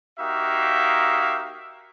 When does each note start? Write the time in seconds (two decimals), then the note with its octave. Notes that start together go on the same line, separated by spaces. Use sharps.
0.19 A#3 D#4 F#4 G4 E5 F5